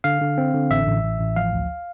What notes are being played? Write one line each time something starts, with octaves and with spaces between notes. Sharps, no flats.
D3 F5
D3
C4
D3
A1 E5
A1
A1
A1
F3 F5
D2